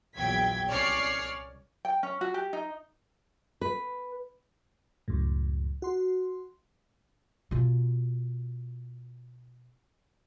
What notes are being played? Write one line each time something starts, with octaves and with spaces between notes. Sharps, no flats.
A#1 E2 F#3 G5 G#6 B6
C2 C#4 C#5 D5 F6 C7
G5
C#4
F#4
G4
D#4
B4
C#2 F#2 A2
F#4 C6
B2 F4